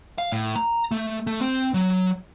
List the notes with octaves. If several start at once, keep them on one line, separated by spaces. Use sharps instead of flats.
F5
A2
A#5
A3
A3
C4
F#3